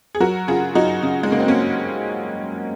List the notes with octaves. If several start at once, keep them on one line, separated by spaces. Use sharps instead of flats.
G#4
F#3 F#4 A#4
C#3 F4 G#4
F#3 D#4 F#4
C#3
G#3
C#3 A#3
C4
A#3 C#4